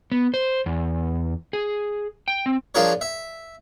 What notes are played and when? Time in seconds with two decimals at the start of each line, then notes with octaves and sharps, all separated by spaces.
0.12 B3
0.34 C5
0.66 E2
1.53 G#4
2.28 G5
2.46 C4
2.75 F3 D4 F4 G#4 A#4 C#5
3.01 E5